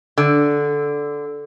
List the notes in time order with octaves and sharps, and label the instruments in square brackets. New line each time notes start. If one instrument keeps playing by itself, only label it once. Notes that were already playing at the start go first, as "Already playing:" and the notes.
[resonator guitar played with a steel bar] D3